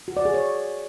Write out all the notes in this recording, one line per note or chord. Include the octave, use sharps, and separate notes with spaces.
F#4
D5
G#4
C#5